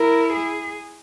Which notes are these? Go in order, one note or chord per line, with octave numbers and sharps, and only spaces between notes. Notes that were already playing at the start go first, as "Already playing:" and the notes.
Already playing: E4 A#4
G#4